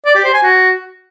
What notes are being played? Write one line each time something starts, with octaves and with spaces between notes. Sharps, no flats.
D5
G4
C5
G#5
F#4